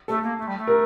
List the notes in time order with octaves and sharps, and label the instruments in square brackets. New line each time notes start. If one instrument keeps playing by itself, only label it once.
[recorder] A3 [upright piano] A4
[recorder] A#3
A3
G3
A3
[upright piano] A#4